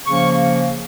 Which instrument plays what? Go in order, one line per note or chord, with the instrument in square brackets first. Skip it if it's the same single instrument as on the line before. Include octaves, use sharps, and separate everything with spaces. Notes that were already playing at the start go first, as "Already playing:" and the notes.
[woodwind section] C#3 F3 A#3 C#4 C#6